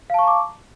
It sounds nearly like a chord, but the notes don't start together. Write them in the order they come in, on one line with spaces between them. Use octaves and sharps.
F5 A5 C#6 A#5 D6